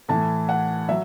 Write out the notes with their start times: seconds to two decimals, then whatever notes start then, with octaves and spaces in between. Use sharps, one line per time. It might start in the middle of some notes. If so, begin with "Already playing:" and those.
0.08 A2 E3 A5
0.49 F#5
0.89 F#3 E5